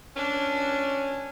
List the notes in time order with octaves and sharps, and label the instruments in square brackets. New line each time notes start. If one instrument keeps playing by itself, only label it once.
[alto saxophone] C#4 [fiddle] D4